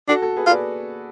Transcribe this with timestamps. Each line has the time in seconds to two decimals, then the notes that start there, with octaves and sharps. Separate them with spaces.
0.08 D4 F#4 A4
0.22 F#4 A4
0.37 G#4 B4
0.46 F4
0.50 B4 D5